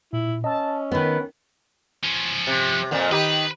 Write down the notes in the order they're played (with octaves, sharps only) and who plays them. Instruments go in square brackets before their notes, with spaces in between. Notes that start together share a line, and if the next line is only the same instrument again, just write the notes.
[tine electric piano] A#2 [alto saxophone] E4
[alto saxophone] C#4 [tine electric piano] D#5 E6 [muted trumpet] A5
[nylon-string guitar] D#3 B3 [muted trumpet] B4
[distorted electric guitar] F3 C#4
[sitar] C3
F2 A#2 F3
[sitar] D#3 D#4 G4 [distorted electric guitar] B4